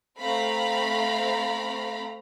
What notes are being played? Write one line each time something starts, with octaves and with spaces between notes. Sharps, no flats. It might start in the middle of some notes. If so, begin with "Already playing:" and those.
A3 C4 F5 A#5 B5